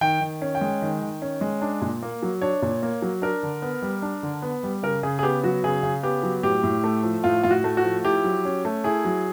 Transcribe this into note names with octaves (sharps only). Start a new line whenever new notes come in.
D#3 G5
D#3
C#4
G5
G#3
D#3
D#3
C#4
G#3
D4
A#2
A#3
F#3
D4 C#5
A#2
A#3
F#3
D4 A#4
D3
B3
G3
D4
D3
B3
G3
C#3 A#4
C#3 G#4
G#4
B3 G4
F#3 F#4
C#3 G#4
C#3
B3 G4
F#3
A2 G4
A2
A3
F3
A2 F4
A2 F4
F#4
A3
F#4
F3
E4 G4
F#3
C#4
A3
E4 G#4
F#3